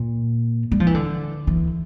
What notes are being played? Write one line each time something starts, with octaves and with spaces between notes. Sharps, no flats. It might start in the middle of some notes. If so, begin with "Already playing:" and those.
Already playing: A#2
G3
F3
E3
D3
E3